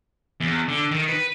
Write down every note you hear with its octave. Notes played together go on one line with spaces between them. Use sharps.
E2
D3
D#3
B4